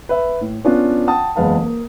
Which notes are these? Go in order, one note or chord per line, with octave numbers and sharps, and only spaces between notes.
B4 E5
A2
B3 C#4 D4 F4
F#5 G5 A5 D#6
F#1 E2 G#3 B4 F5 A5
A#3